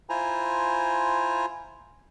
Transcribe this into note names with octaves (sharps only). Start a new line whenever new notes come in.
E4 F4 C5 G#5 A#5